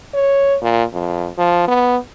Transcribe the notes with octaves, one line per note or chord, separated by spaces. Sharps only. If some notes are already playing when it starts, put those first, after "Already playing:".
C#5
A#2
F2
F3
B3